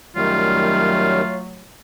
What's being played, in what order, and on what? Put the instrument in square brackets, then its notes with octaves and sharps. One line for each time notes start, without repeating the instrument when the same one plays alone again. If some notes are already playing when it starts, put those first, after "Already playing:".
[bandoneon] F#2 D#3 G3 [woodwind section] F#3 A3 [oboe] F4